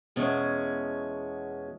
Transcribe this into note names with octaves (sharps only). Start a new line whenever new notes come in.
E2 B2 G#3 C#4